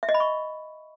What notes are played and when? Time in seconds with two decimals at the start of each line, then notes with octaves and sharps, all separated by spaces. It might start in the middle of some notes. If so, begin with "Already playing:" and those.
0.03 E5
0.09 D#5
0.14 B5
0.20 C#6